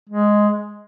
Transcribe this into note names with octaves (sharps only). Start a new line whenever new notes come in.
G#3